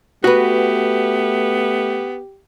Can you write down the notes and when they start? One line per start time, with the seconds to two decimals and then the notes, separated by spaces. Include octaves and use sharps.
0.24 A3 B3 F#4 G4 B4